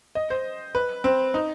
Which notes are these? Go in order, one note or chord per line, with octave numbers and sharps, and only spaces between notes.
D#5
C5
B4
C4
D#4